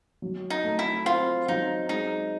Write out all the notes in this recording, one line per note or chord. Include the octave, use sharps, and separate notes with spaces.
F#3
D#4
A3
E4
C4 F4
F#3 D#4
G#3 D#4